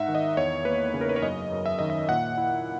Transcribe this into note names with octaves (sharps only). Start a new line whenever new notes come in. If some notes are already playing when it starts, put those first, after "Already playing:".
Already playing: G#2 D#4 E5 F#5
D#3
D#5
E2 C#5
A#3 B4
C#3
A#4
B4
C#5
F#2 D#5
F#2
E5
D#3 D#5
E5
A#2 F#5
E4